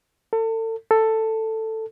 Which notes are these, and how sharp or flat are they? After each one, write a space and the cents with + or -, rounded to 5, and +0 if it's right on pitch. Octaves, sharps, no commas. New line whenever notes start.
A4 +35
A4 +10